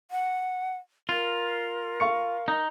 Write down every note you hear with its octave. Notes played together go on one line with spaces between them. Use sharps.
F#5
F4 A#4
F5 C#6 C#7
D#4